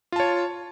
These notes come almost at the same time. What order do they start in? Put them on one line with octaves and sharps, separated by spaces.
F4 A5 C#5